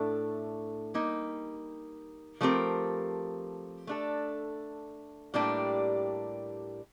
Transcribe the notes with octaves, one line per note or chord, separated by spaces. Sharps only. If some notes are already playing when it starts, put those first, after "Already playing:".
Already playing: A2 A3 D4 A4
G3 A#3 D#4
F3 A3 C4 G4 A#4
A3 D4 A4
A2 G3 A#3 D4 G4